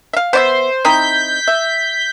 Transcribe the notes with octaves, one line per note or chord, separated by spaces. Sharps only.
E5 F5
B3 C5 D5 E5
C4 D#4 E4 G6 B6
E5